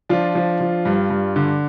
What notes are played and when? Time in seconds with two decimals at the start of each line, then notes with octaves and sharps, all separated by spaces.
0.09 F3 D4 F4
0.35 F3
0.60 F3
0.85 G2
1.10 G2
1.36 D3